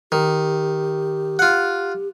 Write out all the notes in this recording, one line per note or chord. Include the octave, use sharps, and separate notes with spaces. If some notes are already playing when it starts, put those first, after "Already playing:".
D#3 G4
F4 F#5